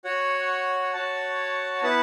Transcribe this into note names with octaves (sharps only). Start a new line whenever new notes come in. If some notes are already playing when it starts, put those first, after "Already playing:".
F#4 C#5 F#5
F#4 C#5 F#5 A5
B3 E4 B4 F#5 A5